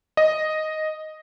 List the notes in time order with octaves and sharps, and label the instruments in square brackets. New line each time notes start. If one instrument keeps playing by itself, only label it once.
[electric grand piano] D#5